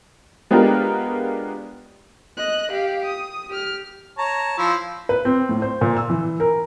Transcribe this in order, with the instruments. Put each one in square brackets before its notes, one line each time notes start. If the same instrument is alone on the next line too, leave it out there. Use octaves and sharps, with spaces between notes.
[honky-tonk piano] G#3 B3 D4 F4 G4 A#4
[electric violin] D#5 F#6
G4 F5
D#6
G4 F6
[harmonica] C#5 A5 A#5
F3 E4
[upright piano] B4
C4
A2
C5
A#2
E6
E3
A#4